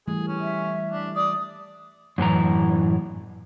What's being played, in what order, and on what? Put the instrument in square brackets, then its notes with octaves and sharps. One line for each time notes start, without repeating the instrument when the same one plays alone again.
[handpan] E3 G3 A3 [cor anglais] G#4
[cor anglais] C#4
[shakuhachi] E5
[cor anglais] D4
[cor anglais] D5 [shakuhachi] D#6
[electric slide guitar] F#2 A2 E3 A#5